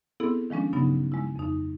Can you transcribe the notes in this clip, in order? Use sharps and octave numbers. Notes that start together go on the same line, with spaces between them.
B3 C4 E4 G#4 A4
D#3 F3 G#3 C#4 D4
G2 C#3 F#3 B3 D#4
G#3 E4
F2 D#4